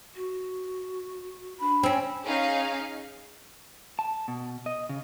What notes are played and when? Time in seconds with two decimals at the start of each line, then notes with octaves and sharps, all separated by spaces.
0.16 F#4
1.60 D4 B5
1.83 C4 C#4
2.25 C#4 D#4 G#4 F5
3.99 A5
4.28 B2
4.66 D#5
4.89 C#3